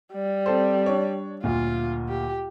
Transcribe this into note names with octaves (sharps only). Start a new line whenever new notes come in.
G3
C4 A4 C5
D4 C#5
D2 A#2 F4
G4